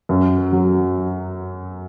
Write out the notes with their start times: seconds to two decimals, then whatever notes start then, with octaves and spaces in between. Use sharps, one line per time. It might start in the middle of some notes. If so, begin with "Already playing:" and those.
0.09 F#2
0.52 F#3